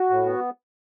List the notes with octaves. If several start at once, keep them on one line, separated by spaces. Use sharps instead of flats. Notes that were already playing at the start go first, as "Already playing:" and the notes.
Already playing: F#4
A2
B3